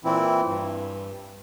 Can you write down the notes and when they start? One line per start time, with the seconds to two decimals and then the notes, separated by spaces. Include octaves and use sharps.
0.04 A#2 E3 C4 E4
0.45 G2